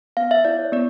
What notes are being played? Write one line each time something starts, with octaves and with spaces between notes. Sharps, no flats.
B3 F5
E5
E4 D5
C#5
B3 D5